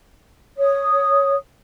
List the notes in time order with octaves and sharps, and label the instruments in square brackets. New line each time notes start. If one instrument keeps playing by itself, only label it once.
[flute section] C#5 D#6